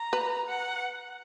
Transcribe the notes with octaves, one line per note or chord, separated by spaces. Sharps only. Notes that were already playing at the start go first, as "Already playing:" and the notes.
Already playing: A#5
B4
F#5